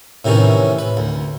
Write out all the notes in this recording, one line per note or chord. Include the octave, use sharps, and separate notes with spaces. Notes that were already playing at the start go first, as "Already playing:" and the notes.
A2 C3 D#3 E3 C#4
B4
D2